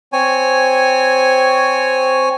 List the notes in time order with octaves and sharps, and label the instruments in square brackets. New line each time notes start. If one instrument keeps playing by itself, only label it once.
[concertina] C4 C#5 G#5